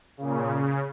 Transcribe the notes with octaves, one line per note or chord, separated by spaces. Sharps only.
A#2 C#3
C#3